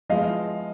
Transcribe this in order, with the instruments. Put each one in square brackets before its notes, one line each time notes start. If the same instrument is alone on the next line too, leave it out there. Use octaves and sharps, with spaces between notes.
[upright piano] F3 G#3 B3 E4 [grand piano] D#5 F5